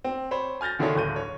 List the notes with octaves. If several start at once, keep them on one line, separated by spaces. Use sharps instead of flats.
C4
C5 C#5 B5
G#5 F6 G6 A6 A#6
D3 D#3 E4 G#4 A4 C#5
D1 G1 G6 D#7
C#5